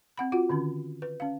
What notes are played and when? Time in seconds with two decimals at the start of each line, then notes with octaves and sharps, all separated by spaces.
0.18 C4 F#5 B5
0.32 F4 F#4 F#5
0.50 D3 D#3 C#4
1.02 B4
1.20 C#4 F5